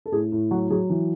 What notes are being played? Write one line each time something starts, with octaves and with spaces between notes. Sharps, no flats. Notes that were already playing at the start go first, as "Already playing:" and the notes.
A4
A2 G#4
A2
F#3 F#4
F#3 G#4
E3